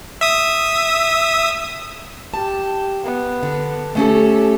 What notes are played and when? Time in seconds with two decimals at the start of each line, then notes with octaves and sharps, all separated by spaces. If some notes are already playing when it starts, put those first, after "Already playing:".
0.21 E5 D#6
2.34 G4 A5
3.04 B3
3.43 D3
3.95 A3 C#4 G4 A4